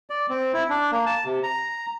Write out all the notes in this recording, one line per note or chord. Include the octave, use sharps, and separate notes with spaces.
D5
C4
E4
D4
A#3
A5
C3
A#5